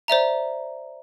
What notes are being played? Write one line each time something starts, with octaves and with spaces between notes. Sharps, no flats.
C5 D5 E5 A#5